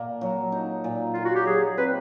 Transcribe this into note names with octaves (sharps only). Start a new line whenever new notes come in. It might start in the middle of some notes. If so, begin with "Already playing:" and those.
Already playing: A#2 A#3
F#3
D#4
A#2
A#3 F4
F#4
G4
F#3 G#4
C4 B4